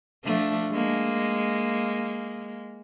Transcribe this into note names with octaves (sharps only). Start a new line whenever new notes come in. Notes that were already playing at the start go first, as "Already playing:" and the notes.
F3 A3 D4
G#3 A#3